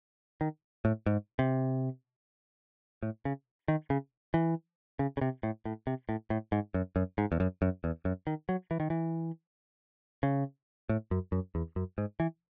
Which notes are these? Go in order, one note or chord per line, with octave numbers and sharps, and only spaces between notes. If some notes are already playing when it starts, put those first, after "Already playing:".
D#3
A2
G#2
C3
A2
C#3
D#3
C#3
E3
C#3
C#3
C3
A2
A2
C3
A2
A2
G#2
F#2
F#2
G#2
E2
F#2
F#2
E2
F#2
D#3
F#3
E3
D#3
E3
C#3
A2
F#2
F#2
E2
F#2
G#2
E3